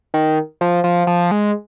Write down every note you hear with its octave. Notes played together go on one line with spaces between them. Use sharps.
D#3
F3
F3
F3
G#3